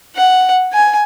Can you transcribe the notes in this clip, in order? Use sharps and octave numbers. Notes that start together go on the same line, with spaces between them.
F#5
G#5